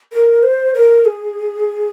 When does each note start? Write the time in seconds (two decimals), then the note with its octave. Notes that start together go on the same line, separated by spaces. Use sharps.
0.12 A#4
0.43 C5
0.74 A#4
1.05 G#4